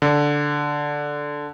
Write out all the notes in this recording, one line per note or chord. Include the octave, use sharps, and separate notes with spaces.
D3